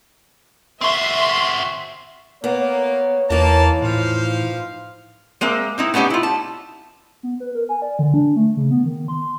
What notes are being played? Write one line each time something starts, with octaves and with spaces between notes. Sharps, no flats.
C4 F#4 E5 C6
A#3 B3 C#5
E2 E3 A#3 D#4 A5
A2 F3 C5 F5
G#3 A#3 C4 E5
C4 D#4 E4
A3 B3 C#4 D#4 G4
E4 F4
A5
B3
B4
A#4
G#5
D5
D3
D4
A3
C#3
B3
D#3
C6